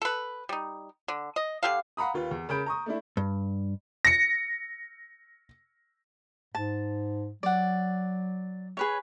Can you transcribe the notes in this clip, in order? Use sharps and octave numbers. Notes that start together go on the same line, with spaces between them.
A4 B4
G3 D#4
D3
D#5
D3 G4 A4 F5
F5 F#5 A#5 B5 D#6
D#2 F4 B4
E2
C#3 A#4 B5 G6 D7
A#5 C#6 D#6
A3 D4 E4
G2
A#6 C#7
G#2 A5
F#3 D5 F#5
G#4 B4 C#5